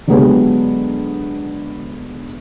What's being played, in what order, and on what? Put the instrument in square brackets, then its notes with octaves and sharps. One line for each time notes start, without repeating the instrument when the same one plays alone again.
[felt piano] D3 F#3 G#3 B3 G4 G#4